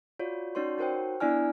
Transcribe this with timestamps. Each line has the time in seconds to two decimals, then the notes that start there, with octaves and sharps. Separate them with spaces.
0.19 F4 F#4 C#5 D5
0.55 C#4 D#4 F#4 C#5 D5 C6
0.78 D#4 F#4 A#4 C5 C#5 G5
1.20 B3 D4 E4 D5 G#5 F6